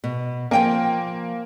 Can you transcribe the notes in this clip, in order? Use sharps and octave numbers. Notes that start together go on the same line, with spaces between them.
B2
F3 A#3 G5 G#5